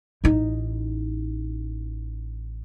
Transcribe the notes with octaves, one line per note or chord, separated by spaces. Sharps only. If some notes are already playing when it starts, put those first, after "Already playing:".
A1 D#4